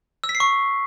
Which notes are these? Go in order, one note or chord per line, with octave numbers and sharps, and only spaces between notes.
E6
B6
C7
C#6